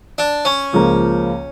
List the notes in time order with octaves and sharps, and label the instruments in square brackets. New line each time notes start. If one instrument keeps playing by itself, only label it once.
[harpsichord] D4
C#4
[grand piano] C#2 C#3 F3 A#3